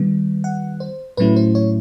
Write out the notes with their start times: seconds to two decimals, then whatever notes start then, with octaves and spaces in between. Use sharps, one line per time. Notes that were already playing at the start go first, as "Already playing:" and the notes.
Already playing: D#3 G3 B3
0.44 F#5
0.80 C5
1.17 A2 F#3 A3 C#4 E4 B4
1.36 C5
1.55 C#5